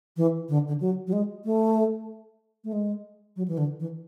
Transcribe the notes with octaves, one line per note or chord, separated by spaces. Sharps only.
E3
D3
D3
F#3
F#3
G#3
A3
A3
G#3
F#3
E3
D3
E3